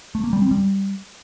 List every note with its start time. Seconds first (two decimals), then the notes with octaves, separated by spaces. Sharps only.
0.15 A3
0.24 A#3
0.33 G3
0.42 C4
0.51 G3